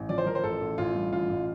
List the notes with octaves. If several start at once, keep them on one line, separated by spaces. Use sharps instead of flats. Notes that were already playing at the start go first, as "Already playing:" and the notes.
Already playing: A1
F3 D5
C5
F3 A#4
C5
A1 A4
A1
A1 F4
G2
A1 F4
A1